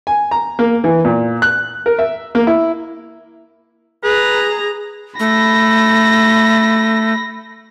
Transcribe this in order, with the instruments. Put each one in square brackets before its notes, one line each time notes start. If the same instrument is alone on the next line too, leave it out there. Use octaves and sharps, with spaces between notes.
[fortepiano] G#5
A#5
A#3
E3
A#2
F#6
A#4
E5
A#3
E4
[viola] G#4 A#5 [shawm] B4
[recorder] A3 [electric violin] B5 A#6